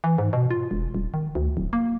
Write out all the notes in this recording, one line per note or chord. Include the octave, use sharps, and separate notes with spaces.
E3
G#2
B2
F4
E1
D#1
D#3
D2
D1
A#3